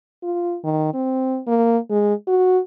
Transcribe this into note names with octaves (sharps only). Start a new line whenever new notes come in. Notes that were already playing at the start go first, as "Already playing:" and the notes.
F4
D#3
C4
A#3
G#3
F#4